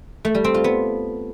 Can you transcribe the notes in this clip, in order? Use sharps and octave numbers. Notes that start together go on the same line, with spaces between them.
A3
G3
C4
F4
B3